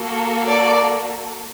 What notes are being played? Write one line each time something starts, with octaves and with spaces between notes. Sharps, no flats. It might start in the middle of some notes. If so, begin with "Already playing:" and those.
Already playing: A#3 F#4 A4
D5